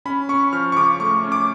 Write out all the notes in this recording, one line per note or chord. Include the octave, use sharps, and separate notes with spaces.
C#4 B5
C#4 C#6
F3 F6
C#6
C#3 D6
A3 C#6
C#4
D6